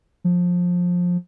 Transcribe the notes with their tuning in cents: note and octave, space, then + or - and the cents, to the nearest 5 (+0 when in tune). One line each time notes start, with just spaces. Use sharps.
F3 +20